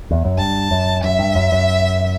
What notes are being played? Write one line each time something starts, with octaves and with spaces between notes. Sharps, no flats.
E2
F#2
G2 A5
F#2
F#2 E5
G2
F#2
F#2